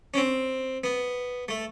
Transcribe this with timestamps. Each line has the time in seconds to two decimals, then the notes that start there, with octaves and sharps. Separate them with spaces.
0.14 C#4
0.17 C4
0.84 B3
1.48 A3